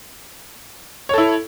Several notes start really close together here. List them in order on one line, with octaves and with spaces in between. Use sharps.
C#5 A4 E4